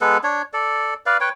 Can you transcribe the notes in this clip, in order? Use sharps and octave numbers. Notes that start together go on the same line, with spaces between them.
G#3 B3 A4 B4
D4 C#5
A4 D5
B4 D5 F5
B4 C#5 G5